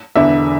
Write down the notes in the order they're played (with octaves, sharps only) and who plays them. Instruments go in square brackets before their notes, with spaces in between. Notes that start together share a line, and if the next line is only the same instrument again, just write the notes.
[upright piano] E1 E2 D3 E5